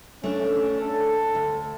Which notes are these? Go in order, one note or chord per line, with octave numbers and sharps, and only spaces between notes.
A3 C#4 D4
A4
D2